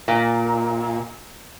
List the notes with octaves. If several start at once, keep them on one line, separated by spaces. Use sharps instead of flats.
A#2